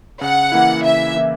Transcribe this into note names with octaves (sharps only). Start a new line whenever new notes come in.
C#3 F#5
E3 A#3 E4
C#3 E5
E3 A#3 E4